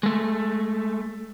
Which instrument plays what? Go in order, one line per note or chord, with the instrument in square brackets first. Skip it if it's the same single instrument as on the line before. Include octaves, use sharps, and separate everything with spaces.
[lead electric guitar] G#3 A3